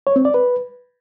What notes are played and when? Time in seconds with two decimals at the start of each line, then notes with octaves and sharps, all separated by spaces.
0.07 C#5
0.16 C4
0.25 D5
0.34 B4